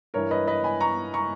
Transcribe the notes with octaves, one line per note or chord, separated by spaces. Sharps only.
G2 E3 A#4 C#5
B4 D#5
B4 D#5
G#5 B5
A#5 C#6
A#5 C#6